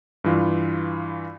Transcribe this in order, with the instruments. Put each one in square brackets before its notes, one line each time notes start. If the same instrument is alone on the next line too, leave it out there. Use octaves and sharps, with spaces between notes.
[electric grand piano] G2 E3 F4